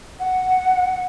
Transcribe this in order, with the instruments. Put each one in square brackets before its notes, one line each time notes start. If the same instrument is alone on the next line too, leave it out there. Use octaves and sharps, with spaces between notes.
[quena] F#5